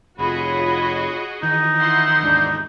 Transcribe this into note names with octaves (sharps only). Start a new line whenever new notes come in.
F1 F4 F#4 G#4 C#5 D#5 B5
D#3 E3 D#4 D#6
E4 F#5 C6
D#2 G#2 E3 D4 G6